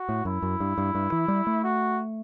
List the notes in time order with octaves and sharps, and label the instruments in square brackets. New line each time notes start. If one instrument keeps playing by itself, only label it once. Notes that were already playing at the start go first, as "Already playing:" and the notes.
Already playing: [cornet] F#4
[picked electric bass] A2
[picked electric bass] F#2 [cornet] E4
[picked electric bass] F#2
G2
G2
G2
E3
G3
A3
[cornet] F#4